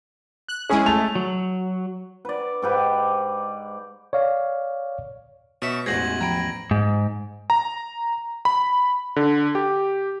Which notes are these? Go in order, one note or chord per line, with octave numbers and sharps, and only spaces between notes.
F#6
G#3 C#4 E4 G#4 G#5
A3 A5 F7
F#3
B4 D5
G#2 G4 B4
C#5 D5 F5
B2 C#5 E5
A1 E2 G#3 F#4 C5 G#6 A#6 F#7
F3 G5 A#5 B5 G#6 D7
G#2
A#5
B5
D3
G4